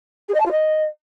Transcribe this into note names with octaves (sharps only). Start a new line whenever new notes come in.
G#4
D#5
A5
F4
D#5